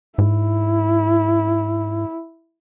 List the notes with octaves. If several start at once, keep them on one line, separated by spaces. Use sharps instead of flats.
G#2 E4